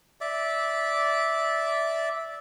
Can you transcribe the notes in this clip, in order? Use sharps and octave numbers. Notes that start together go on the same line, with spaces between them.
D5 E5